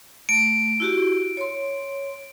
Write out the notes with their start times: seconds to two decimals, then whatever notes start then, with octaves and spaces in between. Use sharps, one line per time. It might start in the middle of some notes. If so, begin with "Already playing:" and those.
0.29 A3 D7
0.80 E4 F#4 G4
1.37 C#5 C6